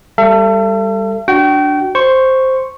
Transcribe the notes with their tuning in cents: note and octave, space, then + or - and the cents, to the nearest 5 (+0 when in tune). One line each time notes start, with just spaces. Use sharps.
G3 +15 A4 +25 E5 +45
D4 +0 F#4 +0 G5 -30
C5 +0 C#6 -5